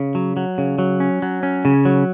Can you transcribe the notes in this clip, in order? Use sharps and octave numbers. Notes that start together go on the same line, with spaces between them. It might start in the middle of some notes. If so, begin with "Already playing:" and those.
Already playing: C#3
F#3
F#3
C#3
F#3
C#4
F#3
C#4
C#3
F#3